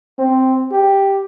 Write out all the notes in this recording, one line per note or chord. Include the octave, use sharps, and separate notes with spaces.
C4
G4